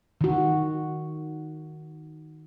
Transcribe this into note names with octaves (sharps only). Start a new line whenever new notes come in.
D#3 F#4